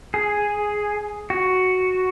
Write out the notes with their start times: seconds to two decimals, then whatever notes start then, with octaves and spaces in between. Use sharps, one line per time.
0.14 G#4
1.30 F#4